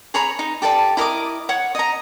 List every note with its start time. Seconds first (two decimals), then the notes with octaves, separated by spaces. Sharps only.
0.14 G#4 C#5 A#5 B5
0.39 D#4
0.62 G4 A4 D5 A5
0.97 E4 A#4 D#5 D6
1.49 C#5 F#5
1.75 D#5 A#5